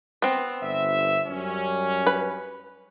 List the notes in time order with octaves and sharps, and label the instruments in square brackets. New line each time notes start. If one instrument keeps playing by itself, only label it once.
[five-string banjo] B3 C4
[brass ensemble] G1 E5
F#2 G3 C#4
[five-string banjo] B4